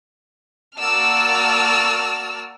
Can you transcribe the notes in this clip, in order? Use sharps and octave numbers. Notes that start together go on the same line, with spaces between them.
A#3 F#4 D5 A5 E6 F6